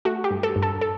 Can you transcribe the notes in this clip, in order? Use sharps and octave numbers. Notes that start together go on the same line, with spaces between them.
A3 F#4
G4
G2
A4
G2
A4
A4